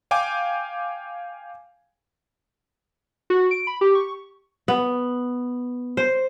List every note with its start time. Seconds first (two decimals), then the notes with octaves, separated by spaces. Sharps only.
0.11 F5 G5 G#5 D6
3.30 F#4
3.51 D7
3.67 B5
3.81 G4
3.95 C#6
4.68 B3
5.97 C5